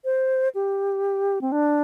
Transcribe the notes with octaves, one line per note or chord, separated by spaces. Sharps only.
C5
G4
C4
D4